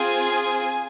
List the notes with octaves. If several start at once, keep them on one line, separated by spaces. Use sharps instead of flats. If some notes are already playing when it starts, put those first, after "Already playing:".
Already playing: C4 F4 G#4 G#5